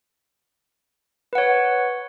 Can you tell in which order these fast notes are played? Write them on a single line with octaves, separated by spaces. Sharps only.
B4 F#5 C#5